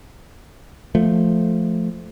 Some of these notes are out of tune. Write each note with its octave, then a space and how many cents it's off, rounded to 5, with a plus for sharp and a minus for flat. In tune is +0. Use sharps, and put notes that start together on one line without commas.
F3 +0 A3 +0